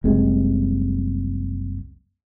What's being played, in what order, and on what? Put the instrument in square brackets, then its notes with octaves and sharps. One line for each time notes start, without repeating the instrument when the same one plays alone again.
[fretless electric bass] F#1 C2 C3 G#3